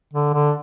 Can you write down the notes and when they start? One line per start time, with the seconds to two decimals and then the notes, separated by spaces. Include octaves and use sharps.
0.13 D3
0.33 D3